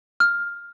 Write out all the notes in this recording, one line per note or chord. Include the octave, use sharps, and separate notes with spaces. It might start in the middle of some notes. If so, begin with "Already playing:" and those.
F6